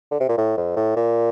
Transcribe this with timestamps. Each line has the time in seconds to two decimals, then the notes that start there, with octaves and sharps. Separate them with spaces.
0.11 D3
0.20 C3
0.29 A#2
0.38 A2
0.57 F2
0.76 A2
0.96 A#2